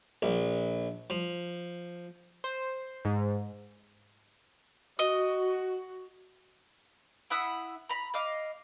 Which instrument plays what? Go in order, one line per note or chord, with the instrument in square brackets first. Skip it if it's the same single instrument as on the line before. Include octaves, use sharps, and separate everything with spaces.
[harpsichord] A#1
F3
[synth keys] C5
G#2
[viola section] F#4 [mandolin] D#5
[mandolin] E4 E5 F#5 D#6
A#5 B5
D#5 F5 D6